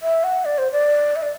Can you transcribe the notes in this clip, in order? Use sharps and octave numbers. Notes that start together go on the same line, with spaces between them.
E5
F#5
D5
C5
D5
E5
D5